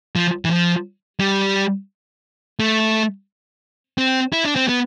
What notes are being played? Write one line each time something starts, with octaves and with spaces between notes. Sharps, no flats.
F3
E3
F3
G3
A3
C4
E4
D4
C4
B3